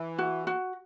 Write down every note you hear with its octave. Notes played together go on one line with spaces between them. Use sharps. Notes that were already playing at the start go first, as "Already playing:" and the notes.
Already playing: E3
F#4
F#4